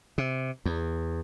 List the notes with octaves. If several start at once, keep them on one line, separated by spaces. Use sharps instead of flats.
C3
E2